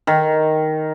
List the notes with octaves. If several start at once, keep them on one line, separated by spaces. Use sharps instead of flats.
D#3